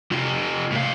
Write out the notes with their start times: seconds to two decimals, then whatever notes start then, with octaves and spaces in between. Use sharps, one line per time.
0.11 C3 F4
0.72 A2 F5